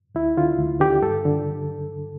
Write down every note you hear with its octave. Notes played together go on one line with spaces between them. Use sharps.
D2 E4
D3 F4
D2
D3 G4
G2 A4
D3